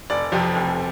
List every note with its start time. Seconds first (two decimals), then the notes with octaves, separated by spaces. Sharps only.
0.10 F1 D5
0.32 F2 C3 F3
0.55 F1